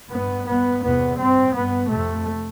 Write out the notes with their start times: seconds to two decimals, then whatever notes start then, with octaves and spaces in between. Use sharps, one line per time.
0.12 G2 B3
0.47 G2 B3
0.83 E2 C3 B3
1.18 G2 C4
1.54 G2 B3
1.89 F2 C3 A3